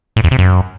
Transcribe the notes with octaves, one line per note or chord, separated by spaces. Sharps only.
A2
E2
C3
F#2